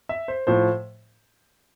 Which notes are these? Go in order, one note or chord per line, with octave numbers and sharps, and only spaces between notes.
E5
C5
A2 F3 C5